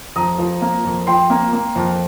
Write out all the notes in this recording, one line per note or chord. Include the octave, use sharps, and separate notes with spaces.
F2 A#5 D#6
F3
A#3
F2
F3 G5 C6
A#3
A#3
F2